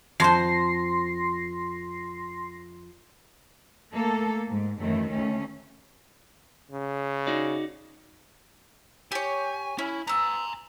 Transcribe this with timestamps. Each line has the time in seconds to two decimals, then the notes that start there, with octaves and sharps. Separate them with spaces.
0.20 F2 C5 C6 A#6 C7
3.91 A3 A#3 A4
4.48 G#2
4.79 F#2 D#3 E3 A3
5.11 D2 A3 C#4
6.72 C#3
7.27 D#4 F#4 D5
9.12 G4 C#5 G#5
9.79 C#4 E4
10.07 B3 G#5 A#5 E6